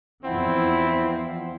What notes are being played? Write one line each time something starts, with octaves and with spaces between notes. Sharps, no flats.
E2 F3 C4 E4 F#5